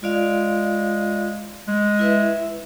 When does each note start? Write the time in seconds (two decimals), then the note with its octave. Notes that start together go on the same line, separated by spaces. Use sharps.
0.03 G#3 F4 D5 F5
1.68 G#3
1.99 E4 B4 E5